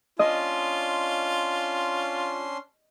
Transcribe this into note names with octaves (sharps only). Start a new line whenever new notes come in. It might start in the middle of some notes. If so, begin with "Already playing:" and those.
C#4 D4 F4 D#5 C6